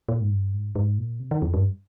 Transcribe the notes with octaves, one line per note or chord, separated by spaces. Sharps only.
A#2
G#2
G2
G#2
G#2
A#2
C3
D#3
F2
G2